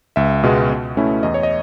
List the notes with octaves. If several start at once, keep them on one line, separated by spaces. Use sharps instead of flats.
C#2 E5
B2 G#3 B3
B2
A3 C#4 E4
E2 D#5
C#5
D#5